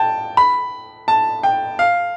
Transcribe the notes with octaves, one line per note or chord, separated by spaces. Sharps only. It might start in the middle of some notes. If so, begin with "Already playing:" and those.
Already playing: G5 A5
B5
A5
G5
F5